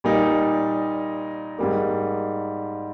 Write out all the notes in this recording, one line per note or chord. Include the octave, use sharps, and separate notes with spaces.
A#2 G3 A#3 D#4 A#4
G#2 G3 A#3